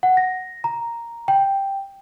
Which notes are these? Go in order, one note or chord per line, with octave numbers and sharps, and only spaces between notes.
F#5
A#6
A#5
G5